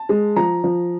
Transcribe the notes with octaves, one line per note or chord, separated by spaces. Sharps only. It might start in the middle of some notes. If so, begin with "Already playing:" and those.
Already playing: A5
G#3
F3 A#5
F3